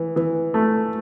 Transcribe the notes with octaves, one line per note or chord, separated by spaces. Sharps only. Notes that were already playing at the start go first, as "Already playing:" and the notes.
Already playing: E3
E3
A3